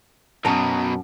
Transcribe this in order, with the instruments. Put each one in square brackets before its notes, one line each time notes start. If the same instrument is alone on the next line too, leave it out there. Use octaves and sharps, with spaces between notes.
[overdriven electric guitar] B1 B2 [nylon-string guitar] F#2 A5 [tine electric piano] A#5 D#6